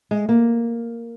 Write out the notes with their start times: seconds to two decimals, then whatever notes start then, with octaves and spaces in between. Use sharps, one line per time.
0.11 G#3
0.29 A#3